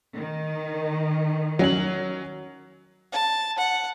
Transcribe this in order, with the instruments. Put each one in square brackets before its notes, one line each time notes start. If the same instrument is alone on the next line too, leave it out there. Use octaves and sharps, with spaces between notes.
[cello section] D#3
[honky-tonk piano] F#3 C#4 F#7
[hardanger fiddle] A5
F#5